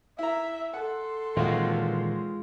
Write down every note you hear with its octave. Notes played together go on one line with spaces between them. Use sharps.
E4 E5 A#5
A4 F#5 C6
A#2 D#3 E3 G#3 C4 F4 F#4 D#5